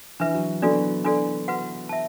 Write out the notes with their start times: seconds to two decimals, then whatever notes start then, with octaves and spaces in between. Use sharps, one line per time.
0.20 E3 D4 B4 E5
0.34 F#3
0.62 F#3 B3 D4 F#4 A4 D5
1.05 D4 F#4 A4 D5
1.48 F#4 B4 F#5
1.89 E5 A5